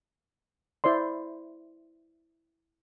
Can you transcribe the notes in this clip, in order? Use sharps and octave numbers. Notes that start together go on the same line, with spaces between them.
E4 C5 D5 C6